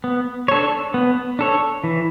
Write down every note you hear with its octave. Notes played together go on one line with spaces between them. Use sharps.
B3
D4 A4 C#5
B3
D4 A4 C#5
E3